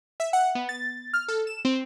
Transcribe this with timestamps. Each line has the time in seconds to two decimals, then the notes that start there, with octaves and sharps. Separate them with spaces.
0.20 E5
0.33 F#5
0.55 B3
0.69 A6
1.13 F6
1.28 A4
1.47 E7
1.65 C4